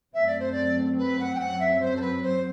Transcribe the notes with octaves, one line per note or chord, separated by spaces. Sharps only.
F#2 F#3 A3 C4 E5
D5
C5
D5
B4
F#5
G5
F#2 F#3 C4 F#5
E5
C5
A4
B4
C5